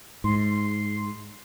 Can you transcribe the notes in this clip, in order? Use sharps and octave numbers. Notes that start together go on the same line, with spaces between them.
G#2 C6